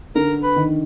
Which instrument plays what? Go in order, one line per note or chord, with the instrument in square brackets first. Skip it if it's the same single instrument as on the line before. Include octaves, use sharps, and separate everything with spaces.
[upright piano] D3 [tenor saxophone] A#4
[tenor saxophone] B4
[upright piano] D#3